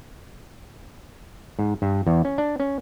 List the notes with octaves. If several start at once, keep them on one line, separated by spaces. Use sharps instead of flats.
G#2
G2
E2
C#4
D4
C#4